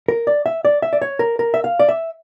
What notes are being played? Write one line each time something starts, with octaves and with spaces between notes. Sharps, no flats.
A#4
D5
E5
D5
E5
D5
C#5
A#4
A#4
E5
F5
D5
E5